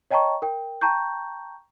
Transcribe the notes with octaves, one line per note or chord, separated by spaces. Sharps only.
C#5 D#5 G5 A5 A#5 C#6
A#4 G5
G5 A5 A#5 C#6 G6